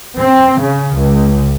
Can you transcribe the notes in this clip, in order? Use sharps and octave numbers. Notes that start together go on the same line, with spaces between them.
C4
C#3
C#2